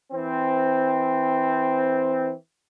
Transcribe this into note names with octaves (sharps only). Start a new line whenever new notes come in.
E3 C4